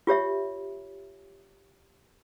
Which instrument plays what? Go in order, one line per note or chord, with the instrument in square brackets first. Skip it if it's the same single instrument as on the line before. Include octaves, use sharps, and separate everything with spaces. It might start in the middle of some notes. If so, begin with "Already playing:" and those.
[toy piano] F4 G4 C#5 E5